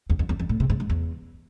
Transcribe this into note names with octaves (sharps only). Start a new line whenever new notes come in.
E2
F2
E2
F2
A2
C3
G#2
G#2
E2